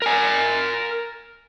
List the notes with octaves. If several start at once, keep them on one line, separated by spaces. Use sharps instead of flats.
A#4 G#5